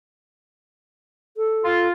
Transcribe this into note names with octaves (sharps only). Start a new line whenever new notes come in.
A4
F4